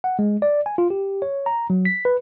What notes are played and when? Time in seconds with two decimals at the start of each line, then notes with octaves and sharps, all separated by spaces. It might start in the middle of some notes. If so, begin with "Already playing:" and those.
0.04 F#5
0.19 G#3
0.42 D5
0.66 G#5
0.78 F4
0.90 G4
1.22 C#5
1.46 A#5
1.70 F#3
1.85 B6
2.05 B4